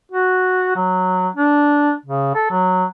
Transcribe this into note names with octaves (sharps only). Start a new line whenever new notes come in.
F#4
F#3
D4
C#3
A4
F#3